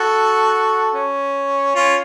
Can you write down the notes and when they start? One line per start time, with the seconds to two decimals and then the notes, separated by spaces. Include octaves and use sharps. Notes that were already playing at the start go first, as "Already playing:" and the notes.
Already playing: F#4 A4
0.95 C#4
1.75 C#4 F4